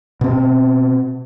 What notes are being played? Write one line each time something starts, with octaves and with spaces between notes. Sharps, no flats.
B2 C4